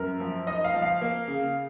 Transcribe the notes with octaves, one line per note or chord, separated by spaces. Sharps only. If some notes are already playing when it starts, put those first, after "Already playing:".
Already playing: F#2 A#4
F3
D#4 D#5
F5
F3
F5
A#3
C#3